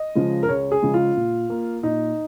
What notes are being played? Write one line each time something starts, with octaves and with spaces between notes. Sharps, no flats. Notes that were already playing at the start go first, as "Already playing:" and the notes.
Already playing: D#5
C#3 F3 G#3
A#4
C#2 C#5
G#4
C#3 F3 G#3
F4
A#2
A#3
A#2 D#4